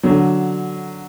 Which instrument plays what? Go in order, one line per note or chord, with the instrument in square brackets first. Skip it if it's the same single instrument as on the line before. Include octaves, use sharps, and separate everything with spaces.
[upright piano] D3 F#3